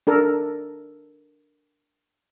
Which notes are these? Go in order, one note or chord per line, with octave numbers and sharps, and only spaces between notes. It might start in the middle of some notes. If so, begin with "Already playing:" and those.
D4 A4 A#4